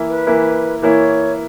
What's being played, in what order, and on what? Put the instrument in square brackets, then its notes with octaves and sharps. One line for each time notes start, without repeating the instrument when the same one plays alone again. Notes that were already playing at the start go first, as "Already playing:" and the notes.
Already playing: [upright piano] E3 A#3 E4
[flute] B4
[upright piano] E3 A#3 E4
[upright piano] E3 A#3 E4 [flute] C#5